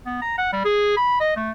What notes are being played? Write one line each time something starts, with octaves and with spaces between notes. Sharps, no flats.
B3
A#5
F#5
G3
G#4
B5
D#5
A3